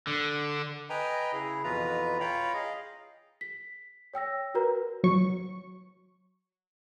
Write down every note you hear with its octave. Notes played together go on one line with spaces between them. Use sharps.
D3
B4 D#5 G5 G#5 A#5
C#3 E4 G#4
F2 B2 E3 F4 B4 A#5
F4 C#5 F5 G5 A#5 B5
G#4 D#5 F5
B6
C#5 G5 E6 A#6
F#4 A#4 B4 A#5
F#3 C#6